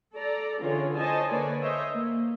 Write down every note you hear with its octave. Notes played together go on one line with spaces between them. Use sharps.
A4 D5 A#5
D3 E3 C#4 F4 G#4 C#5
C5 C#5 D#5 G#5 A5
D3 A#3 B4 C#5 D5 G#5
C5 C#5 D#5 E5
A#3